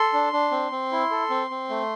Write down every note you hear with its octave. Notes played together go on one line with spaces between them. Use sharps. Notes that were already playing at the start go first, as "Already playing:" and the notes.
Already playing: A4 C6
D4
D4
C4
C4
E4
A4
C4
C4
A3